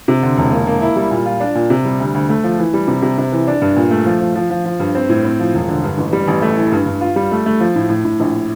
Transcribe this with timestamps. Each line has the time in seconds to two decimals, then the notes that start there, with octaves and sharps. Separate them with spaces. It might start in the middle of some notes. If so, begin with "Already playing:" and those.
0.08 C3
0.22 D3
0.37 E1
0.52 A#3
0.66 A#3
0.81 E4
0.96 G3
1.11 A#2
1.26 F4
1.40 D4
1.55 A#2
1.70 C3
1.85 G3
1.99 D2
2.14 D2
2.29 A3
2.44 F3
2.58 E3
2.73 G3
2.87 C3
3.02 C3
3.18 C3
3.32 E3
3.47 D4
3.62 G2
3.76 A#2
3.91 A3
4.06 F3
4.21 F3
4.35 F3
4.50 F3
4.65 F3
4.80 G2
4.95 C4
5.09 A2
5.25 C4
5.40 F3
5.54 E1
5.68 D3
5.83 G2
5.98 A1
6.13 G3
6.28 A1
6.42 A3
6.57 E3
6.72 G2
6.86 G2
7.01 F4
7.16 G3
7.31 A3
7.46 A3
7.60 F3
7.76 A2
7.89 A2
8.05 A2
8.20 A#1